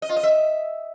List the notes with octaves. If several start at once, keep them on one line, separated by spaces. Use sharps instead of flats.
D#5
F4
D#5
E5